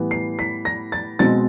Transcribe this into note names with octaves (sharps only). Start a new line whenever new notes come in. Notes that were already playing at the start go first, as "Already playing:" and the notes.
Already playing: A2 E3 G3 B3
C7
B6
A#6
A6
B2 G#3 C4 A6